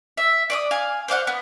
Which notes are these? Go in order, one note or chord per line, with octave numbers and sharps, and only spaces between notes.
E5
D5 C6 D#6
F5 G#5
C5 D5 F5 F#5
B3